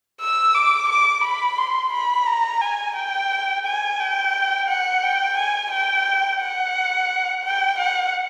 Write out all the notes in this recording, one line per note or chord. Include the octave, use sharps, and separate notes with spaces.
E6
D6
D6
B5
C6
B5
A#5
G#5
G5
G#5
G5
F#5
G5
G#5
G5
F#5
G5
F#5